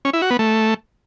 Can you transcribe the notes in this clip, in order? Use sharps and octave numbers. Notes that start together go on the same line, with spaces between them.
C#4
E4
F#4
B3
A3